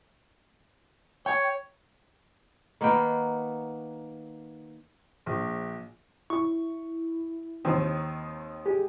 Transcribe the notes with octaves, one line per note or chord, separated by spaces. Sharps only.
C#5 G5
D#3 A#3 B3 G5
A#1
E4 C#6
D#2 D#3 C4
G#3 G4